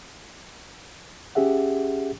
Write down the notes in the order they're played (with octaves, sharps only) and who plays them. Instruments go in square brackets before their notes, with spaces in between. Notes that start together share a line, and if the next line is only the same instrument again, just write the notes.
[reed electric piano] C#4 G4 G#4 E5 F#5